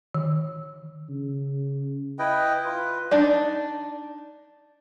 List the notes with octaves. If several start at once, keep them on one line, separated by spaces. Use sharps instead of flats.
D#3
C#3
E4 B4 D#5 G5
F4 B4
D4 D#4 D5